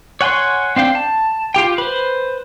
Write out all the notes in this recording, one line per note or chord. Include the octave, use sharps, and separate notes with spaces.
C#5 F#5 G#5 C6 C#6
C4 D4 F5 G5
A5
F4 G4 G5
B4 C5